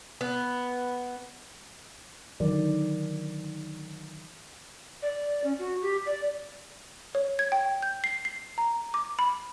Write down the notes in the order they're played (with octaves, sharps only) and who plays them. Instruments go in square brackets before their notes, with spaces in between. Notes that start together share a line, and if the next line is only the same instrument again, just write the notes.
[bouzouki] B3
[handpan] D3 D#3 F#3 D5
[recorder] D5
C#4
F#4
G4
D5
[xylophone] C#5
G#6
G5
G6
C7
C7
A#5
D6
B5